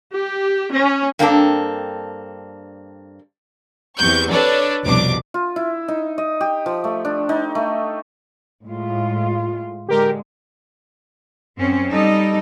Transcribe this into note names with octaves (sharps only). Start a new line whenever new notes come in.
G4
C#4
G2 A#3 C4 D4 F#4 A4
E2 C3 C#6 G6
D4 A4 B4 C#5 D5
C2 F2 B2 D4 D6
F4
E4
D#4
D#5
G4
F3
A3
D4
D#4
A3
A2 G#3 F4
D3 G#3 G4 A#4
F#2 C4 C#4
G3 D#4 A4 D#5